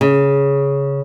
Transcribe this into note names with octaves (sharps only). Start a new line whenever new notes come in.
C#3